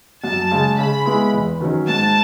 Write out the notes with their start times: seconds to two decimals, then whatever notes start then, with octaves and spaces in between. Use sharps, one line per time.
0.24 F#2 A5
0.51 C#3 G#3
0.78 C#3 B5
1.06 G#3 B3 E4
1.34 E2
1.61 D#3 F#3 C#4
1.87 G#2 A5